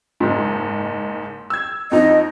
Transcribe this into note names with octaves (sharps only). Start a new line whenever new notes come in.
F#1 G#2
E6 G#6
F2 D#4 D#5